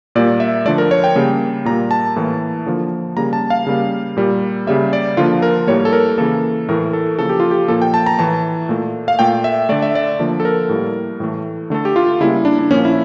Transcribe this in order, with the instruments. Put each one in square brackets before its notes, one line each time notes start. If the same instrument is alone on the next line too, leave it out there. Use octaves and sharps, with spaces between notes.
[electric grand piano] A#2 G3 A#3 D5
E5
D3 F3 A3 D5
A#4
C#5
G5
C#3 G3 A#3
A#2 G3 A#3 A#5
A5
A2 E3 A#3
D3 F3 A#3
C#3 G3 A#3 A#5
A5
F5
C#3 G3 A#3
A#2 G3 A#3
C#3 G3 A#3 E5
D5
D3 F3 A#3 F4
A#4
A2 G3 A#3 C#5
A4
A#4
C#3 E3 A#3 A4
A2 E3 A3 A#4
A4
C#3 F3 A#3 A4
G4
F4
G4
A#2 F3 A#3 A4
G5
A5
A#5
A2 E3 A3 A5
A#2 A3
F5
A#2 A3 G5
E5
D3 A3 D5
E5
D5
D3 F3 A#3
A4
A#4
A2 G3 A#3
A2 E3 A3
D3 A3 A4
G4
F4
C#3 G3 A#3 E4
D4
D4
A#2 F3 A#3 C#4
E4